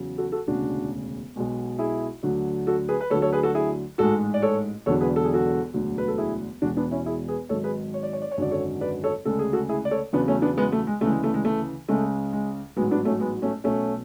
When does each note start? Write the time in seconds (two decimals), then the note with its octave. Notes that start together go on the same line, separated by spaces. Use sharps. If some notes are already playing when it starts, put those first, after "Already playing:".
Already playing: E2 C#3 F#3
0.18 F#4 A4
0.32 F#4 A4
0.47 E1 D2 C#3 D4 F#4
1.36 B1 B2 G#3
1.79 E4 G#4
2.23 D2 D3 F#3
2.67 F#4 A4
2.89 G#4 B4
3.01 B4
3.10 D2 D3 F#3 A4 C#5
3.22 A4 C#5
3.33 G#4 B4
3.43 F#4 A4
3.55 E4 G#4
3.98 A1 G#2 G#3 F#4 A4
4.34 D5
4.42 A4 C#5
4.86 E1 E2 D3 F#3 A4 C#5
5.01 G#4 B4
5.16 A4
5.25 G#4
5.34 F#4 A4
5.74 E1 D2 D3 F#3
5.98 B4
6.08 A4
6.18 E4 G#4
6.62 E1 E2 B2 G#3 D4 F#4
6.77 B3 D4
6.91 C#4 E4
7.06 E4 G#4
7.28 G#4 B4
7.49 G#1 G#2 F#3 A4 C#5
7.64 G#4 B4
7.94 C#5
8.03 D5
8.13 C#5
8.22 D5
8.31 C#5
8.37 G#1 F#2 D3 F#3 D5
8.51 A4 C#5
8.81 B4 D5
9.04 A4 C#5
9.25 D2 C#3 G#3 A4
9.39 G#4
9.53 F#4 A4
9.69 E4 G#4
9.85 D5
9.91 A4 C#5
10.13 E2 C#3 F#3 B3 D4
10.28 A3 C#4
10.42 B3 D4
10.58 G#3 B3
10.72 A3
10.87 G#3
11.00 D2 C#3 E3 G#3 A3
11.13 G#3
11.24 A3
11.34 G#3
11.45 A3
11.88 C#2 C#3 G#3 A3
12.33 G#3
12.76 A1 G#2 F#3 G#3 B3
12.91 B3 D4
13.05 A3 C#4
13.20 G#3 B3
13.42 A3 C#4
13.64 B1 B2 F#3 A3 C#4